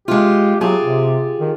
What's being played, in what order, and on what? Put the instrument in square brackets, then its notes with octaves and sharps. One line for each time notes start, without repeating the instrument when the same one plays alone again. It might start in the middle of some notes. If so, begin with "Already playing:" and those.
[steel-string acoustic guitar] G#3 F4 [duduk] G4
[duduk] F#3 [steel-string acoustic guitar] F4 G4 G#4
[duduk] C3
D#3